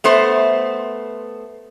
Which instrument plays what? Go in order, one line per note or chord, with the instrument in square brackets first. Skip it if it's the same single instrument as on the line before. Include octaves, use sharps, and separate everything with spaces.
[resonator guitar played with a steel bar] A3 B3 C5